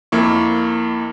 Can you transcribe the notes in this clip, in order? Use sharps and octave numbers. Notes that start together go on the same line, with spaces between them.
F2 A#3 E4 C#6